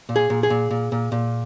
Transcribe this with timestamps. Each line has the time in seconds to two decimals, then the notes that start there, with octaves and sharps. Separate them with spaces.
0.09 A#2
0.16 G#4
0.30 A#2
0.43 G#4
0.50 A#2
0.71 A#2
0.92 A#2
1.12 A#2